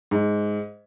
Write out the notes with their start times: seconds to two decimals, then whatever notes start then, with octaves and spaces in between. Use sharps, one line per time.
0.11 G#2